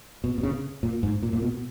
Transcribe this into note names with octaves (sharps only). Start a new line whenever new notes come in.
B2
B2
C#3
A#2
G#2
A#2
A#2
B2